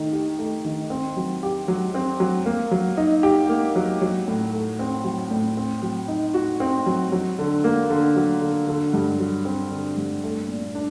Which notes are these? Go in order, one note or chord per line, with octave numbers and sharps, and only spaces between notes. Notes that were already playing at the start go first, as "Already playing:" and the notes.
Already playing: D#3 A3 D#4
G4
A3
D#3
C4
F#3
G4
F#3
C4
F#3
A#3
F#3
D#4
G4
A#3
F#3
F#3
A2
A3
C4
F#3
A2
C4
F#3
D#4
F#4
C4
F#3
F#3
D3
A#3
D3
F#3
D3
D3
G2
F#3
C4
D3
G2
A3
A#2
D4